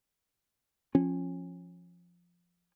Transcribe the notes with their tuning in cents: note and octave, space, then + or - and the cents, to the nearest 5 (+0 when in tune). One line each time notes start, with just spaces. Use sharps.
F3 +0 C#4 -25